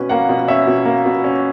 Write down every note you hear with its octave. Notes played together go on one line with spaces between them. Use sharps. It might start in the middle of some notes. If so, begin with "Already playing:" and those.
Already playing: B2 C#4 B4
A#3 F#5
B2
C#4 E5
B2
A#3
B2
C#4